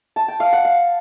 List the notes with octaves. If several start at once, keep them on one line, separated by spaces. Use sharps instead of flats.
A5
G5
F5
F#5
F5